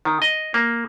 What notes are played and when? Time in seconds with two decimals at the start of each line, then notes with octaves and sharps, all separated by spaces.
0.05 D#3
0.22 D#5
0.54 A#3